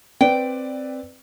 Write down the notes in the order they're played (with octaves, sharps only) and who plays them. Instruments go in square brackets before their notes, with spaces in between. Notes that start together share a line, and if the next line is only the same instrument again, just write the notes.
[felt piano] C4 B4 D5 [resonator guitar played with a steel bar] G5